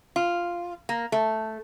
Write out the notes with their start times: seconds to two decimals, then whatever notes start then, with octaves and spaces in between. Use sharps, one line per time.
0.16 F4
0.89 A#3
1.12 A3